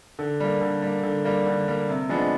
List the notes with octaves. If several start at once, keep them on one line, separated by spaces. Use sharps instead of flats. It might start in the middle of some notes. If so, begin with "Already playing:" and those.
D3
G3 A#3
D3
G3 A#3
D3
G3 A#3
D3
G3 A#3
C3
F3 G#3 B3 D4